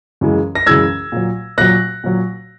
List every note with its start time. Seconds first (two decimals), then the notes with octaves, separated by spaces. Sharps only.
0.21 F#2 C#3 E3 G#3
0.55 A#6
0.66 F#2 C#3 E3 G#3 E6 G#6
1.12 A#2 F#3
1.58 A#2 F#3 F#6 A#6
2.04 A#2 F#3